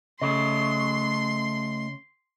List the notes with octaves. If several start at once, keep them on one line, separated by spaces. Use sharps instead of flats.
C#3 A3 A4 D#5 C6